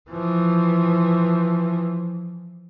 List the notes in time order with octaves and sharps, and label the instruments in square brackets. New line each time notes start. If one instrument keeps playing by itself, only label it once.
[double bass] E3 F3